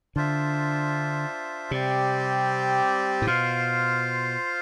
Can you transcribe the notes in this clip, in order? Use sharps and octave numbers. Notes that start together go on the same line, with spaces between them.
D3 D4 F4 C5 E5
C3 G3 C4 G4 D5
A2
B2 F4 C5 F5